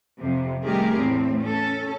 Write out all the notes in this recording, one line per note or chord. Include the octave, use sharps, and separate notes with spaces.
F2 C3
D#3 G3 A3 G4 G#4 A#4
E2 A2 C4
C#4 A4